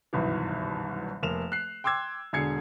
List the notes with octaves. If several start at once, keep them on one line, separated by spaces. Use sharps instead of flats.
F#1 C2 G2 B2 D#3 E3
F1 A#3 E7 F7
F#6 C7
G5 C6 D6 E6 G#6
E1 D3 G#4 G#6 C7 C#7